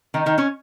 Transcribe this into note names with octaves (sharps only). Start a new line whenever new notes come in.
D#3 D#4
D#3 D#4
C#4 C#5